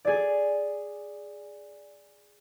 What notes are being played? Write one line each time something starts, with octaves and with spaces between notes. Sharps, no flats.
G#4 D5